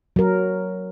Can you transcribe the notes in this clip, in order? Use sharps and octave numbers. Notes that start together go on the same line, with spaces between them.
F#3 A#4